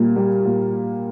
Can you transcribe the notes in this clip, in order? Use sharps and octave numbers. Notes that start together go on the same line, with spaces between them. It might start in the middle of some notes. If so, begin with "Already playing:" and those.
Already playing: A#2 G3 A#3
G3 A#3
A#2